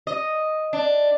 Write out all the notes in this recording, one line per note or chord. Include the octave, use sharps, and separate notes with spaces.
D#5
D4